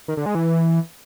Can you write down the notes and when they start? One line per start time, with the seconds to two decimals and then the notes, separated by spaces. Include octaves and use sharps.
0.08 D#3
0.17 D3
0.26 G#3
0.35 E3